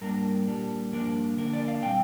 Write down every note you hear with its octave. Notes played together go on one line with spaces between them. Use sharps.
G2 G3 A#3 D4 A#4
A#2 G3 D4
G2 F3 A#3 D4 A#4
D3 A#3 D4 A#4
D5
F5
A#2 G3 C4 G5